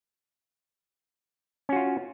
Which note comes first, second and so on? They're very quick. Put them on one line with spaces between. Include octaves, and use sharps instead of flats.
C#4 F#4 F4